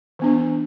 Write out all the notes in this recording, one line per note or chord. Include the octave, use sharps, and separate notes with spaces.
E3 B3 D4